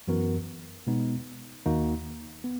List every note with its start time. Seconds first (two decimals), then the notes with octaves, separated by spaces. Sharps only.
0.08 F#2 E3 B3 F#4 A#4
0.87 B2 G#3 B3 D#4
1.66 D#2 D#3 A#3 D#4 F#4
2.44 B3